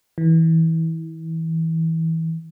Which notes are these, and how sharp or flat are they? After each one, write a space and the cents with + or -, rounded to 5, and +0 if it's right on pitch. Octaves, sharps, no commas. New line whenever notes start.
E3 -25